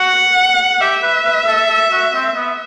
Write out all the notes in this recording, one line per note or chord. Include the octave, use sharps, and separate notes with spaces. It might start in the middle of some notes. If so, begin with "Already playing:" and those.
Already playing: F#4 F#5
G4 E5
B4
B4
A4
A4
F#4
C4
B3